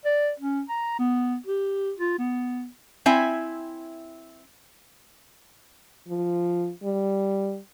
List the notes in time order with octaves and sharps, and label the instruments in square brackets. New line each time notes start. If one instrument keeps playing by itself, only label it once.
[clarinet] D5
C#4
A#5
B3
G4
F4
B3
[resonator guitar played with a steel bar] C4 E4 E5 G#5
[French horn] F3
G3